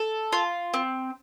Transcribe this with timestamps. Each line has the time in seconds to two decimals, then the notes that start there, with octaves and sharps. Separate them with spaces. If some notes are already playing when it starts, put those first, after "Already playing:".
Already playing: A4
0.32 F4
0.74 C4